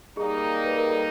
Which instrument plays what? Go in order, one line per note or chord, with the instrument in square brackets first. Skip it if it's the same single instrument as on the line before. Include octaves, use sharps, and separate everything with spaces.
[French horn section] G3 A#3 D#4 [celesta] G#4
[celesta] B4
A#4
A4